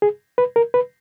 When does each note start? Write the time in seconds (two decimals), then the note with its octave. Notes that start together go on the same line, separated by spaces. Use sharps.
0.02 G#4
0.38 B4
0.56 A#4
0.74 B4